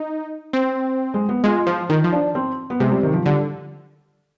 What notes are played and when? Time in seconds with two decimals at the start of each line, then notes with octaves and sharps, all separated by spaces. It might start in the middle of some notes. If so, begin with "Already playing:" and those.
Already playing: D#4
0.53 C4
1.14 G#3
1.29 B3
1.44 G#3 F4
1.67 F3 F4
1.89 D#3 D#4
2.04 F3
2.12 D4
2.35 C4
2.70 B3
2.80 C3 G#3
2.91 G3
3.03 D#3
3.14 F3
3.26 D3 G3